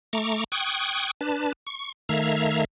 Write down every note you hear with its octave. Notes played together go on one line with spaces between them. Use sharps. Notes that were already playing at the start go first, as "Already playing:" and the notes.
A3 A#5 C#6 D6
G5 C#6 D#6 F#6 G#6
D4 B4 A5
C#6
D#3 A3 E5 F5 A#5 G#6